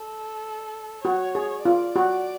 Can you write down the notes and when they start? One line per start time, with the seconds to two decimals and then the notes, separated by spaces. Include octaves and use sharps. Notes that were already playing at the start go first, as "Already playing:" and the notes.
Already playing: A4
1.04 F#4 C#5
1.35 G#4
1.65 F4 D5
1.96 F#4